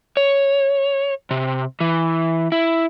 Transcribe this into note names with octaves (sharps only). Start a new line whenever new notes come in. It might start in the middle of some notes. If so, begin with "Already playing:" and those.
C#5
C3
E3
E4